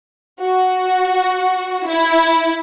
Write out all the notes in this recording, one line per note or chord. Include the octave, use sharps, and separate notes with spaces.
F#4
E4